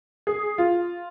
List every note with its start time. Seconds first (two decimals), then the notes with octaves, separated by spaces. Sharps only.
0.27 G#4
0.58 F4